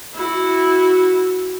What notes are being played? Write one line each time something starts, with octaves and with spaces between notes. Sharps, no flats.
E4 F#4